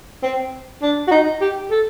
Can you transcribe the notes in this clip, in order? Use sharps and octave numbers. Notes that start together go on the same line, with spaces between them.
C4
D4
F#4
D#4
G4
A4